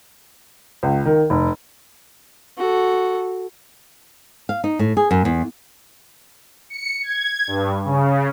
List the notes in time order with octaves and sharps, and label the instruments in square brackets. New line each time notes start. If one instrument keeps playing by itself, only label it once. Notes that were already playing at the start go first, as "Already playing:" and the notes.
[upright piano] C#2
D#3
F1
[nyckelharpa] F#4 A4
[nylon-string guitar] F5
D#4
A2
G#4
F#2
E2
[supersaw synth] C#7
G#6
G2
C#3